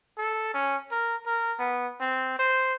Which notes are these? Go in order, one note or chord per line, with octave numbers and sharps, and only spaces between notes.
A4
C#4
A#4
A#4
B3
C4
C5